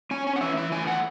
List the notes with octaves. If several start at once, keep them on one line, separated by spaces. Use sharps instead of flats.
C#4 G#5
G#5
F#5
E3 E5
E5
A3 G#5
F#5